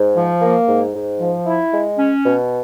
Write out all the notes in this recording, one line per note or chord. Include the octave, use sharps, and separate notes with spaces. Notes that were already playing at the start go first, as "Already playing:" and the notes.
Already playing: G#2
F3
A#3
G#2
G#2
F3
E4
G#3
C#4
B2